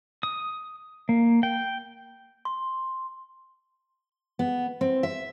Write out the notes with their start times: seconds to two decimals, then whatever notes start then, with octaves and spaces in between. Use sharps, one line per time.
0.23 D#6
1.09 A#3
1.43 G5
2.45 C6
4.39 B3
4.81 C4
5.03 E5